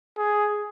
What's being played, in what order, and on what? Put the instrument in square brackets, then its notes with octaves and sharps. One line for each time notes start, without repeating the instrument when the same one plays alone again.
[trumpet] G#4